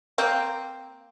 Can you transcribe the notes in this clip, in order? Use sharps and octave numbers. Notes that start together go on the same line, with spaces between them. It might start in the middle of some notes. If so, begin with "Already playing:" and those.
A#3 C4